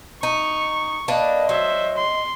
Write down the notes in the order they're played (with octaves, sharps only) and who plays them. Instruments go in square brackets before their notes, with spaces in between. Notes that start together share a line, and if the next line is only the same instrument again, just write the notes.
[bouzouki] D#4 [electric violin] C#6
[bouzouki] A#3 D4 B4 [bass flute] D#5
[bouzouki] F#3 [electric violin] C5 E5
[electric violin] C6